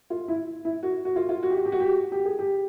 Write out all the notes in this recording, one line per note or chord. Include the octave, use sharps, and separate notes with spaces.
F4
E4
E4
F#4
F#4
F4
F4
F#4
G4
F#4
G4
F#4
G4
F#4
G4
G#4
G4